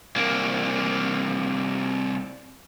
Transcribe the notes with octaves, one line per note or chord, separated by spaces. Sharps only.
C2 A#3